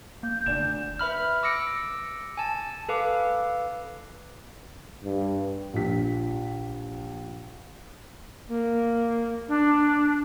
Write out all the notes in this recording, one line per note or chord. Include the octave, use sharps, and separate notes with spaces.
A#3 G6
F1 D2 D5 E7
B4 E5 B5 F6
D6 E6 A#6 C#7 D7
G#5 A5
A4 B4 F5 D6
G2
A#1 F3 G4 B6
A#3
D4